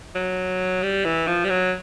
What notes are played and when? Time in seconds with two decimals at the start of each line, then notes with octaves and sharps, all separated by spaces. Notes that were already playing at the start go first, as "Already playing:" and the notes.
0.15 F#3
0.83 G3
1.05 E3
1.27 F3
1.44 G3
1.49 F#3